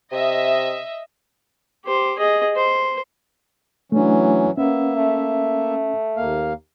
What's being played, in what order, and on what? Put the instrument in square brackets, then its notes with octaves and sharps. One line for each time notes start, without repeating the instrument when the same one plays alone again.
[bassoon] C3 [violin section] D#5 E5
[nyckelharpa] G4 C5
G#4 D#5
C5
[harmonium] E3 F#3 C#4 [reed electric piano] A3 D4
[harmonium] A#3 E5 [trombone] B3 [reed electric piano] C#4
[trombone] A3
[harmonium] D#2 A#3 F5